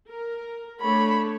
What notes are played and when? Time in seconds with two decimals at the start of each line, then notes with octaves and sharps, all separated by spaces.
0.10 A#4
0.81 A3 D4 C#5 B5